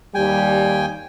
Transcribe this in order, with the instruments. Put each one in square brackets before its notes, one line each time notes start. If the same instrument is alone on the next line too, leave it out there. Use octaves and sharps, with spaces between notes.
[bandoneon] D#2 G5 G#5 [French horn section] G3